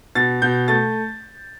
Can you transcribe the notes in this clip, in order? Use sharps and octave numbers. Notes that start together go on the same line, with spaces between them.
B2 A6
B2 G6
A3 A6